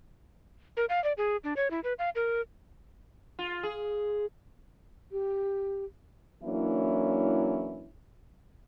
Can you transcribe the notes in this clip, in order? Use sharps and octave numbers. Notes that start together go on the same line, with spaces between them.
A#4
F5
D5
G#4
D4
C#5
E4
B4
F5
A#4
F4
G#4
G4
E3 F#3 A#3 C#4 D4 E4